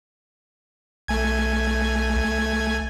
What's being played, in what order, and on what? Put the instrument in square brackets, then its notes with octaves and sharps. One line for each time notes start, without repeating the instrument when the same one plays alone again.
[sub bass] B1 [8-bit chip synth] A3 G#5 G#6
[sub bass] C2